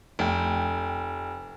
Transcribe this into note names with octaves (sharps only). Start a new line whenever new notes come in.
F1 G5